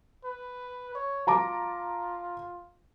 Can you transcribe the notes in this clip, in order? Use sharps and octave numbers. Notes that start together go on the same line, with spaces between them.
B4
C#5
F4 A5 A#5 D6